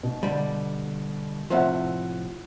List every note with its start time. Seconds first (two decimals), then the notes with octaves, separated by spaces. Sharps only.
0.03 B2
0.23 D3 G3
1.50 A2 C3 F3 C5 E5 F#5